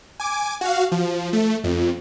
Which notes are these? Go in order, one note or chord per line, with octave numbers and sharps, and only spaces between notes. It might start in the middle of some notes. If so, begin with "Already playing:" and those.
G#5 D6
F#4 F5
F3
A3
F2